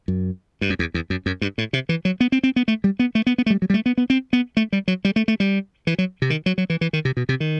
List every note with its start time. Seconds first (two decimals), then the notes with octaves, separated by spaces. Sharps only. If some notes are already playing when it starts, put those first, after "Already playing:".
0.08 F#2
0.61 G2
0.70 F#2
0.79 E2
0.94 E2
1.10 F#2
1.26 F#2
1.41 G2
1.58 A2
1.73 C3
1.89 E3
2.05 F#3
2.21 B3
2.32 C4
2.43 C4
2.56 B3
2.68 A3
2.84 G3
2.99 B3
3.15 A3
3.27 B3
3.38 B3
3.46 A3
3.50 G3
3.62 F#3
3.70 G3
3.74 A3
3.86 B3
3.98 B3
4.10 C4
4.33 B3
4.57 A3
4.73 G3
4.88 F#3
5.05 G3
5.16 A3
5.28 A3
5.40 G3
5.87 E3
5.99 F#3
6.22 C3
6.30 D#3
6.46 F#3
6.58 F#3
6.70 E3
6.81 E3
6.93 D#3
7.05 C3
7.17 B2
7.29 C3
7.40 D#3